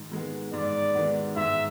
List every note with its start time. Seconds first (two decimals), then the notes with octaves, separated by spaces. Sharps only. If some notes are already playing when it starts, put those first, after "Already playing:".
Already playing: G#2 D#3 G#3
0.12 D#3 G#3 B3
0.53 G#2 D5
0.95 D#3 G#3 B3
1.37 G#2 E5